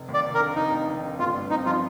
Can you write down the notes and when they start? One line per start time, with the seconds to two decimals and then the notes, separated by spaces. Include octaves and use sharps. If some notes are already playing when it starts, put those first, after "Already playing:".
Already playing: F1
0.09 D#2
0.14 D5
0.24 F1
0.34 A#4
0.40 D3
0.55 F1 D#4
0.72 D#2
0.87 F1
1.03 D3
1.19 G1 F4
1.35 G2
1.50 C4 D#4
1.66 F3 F4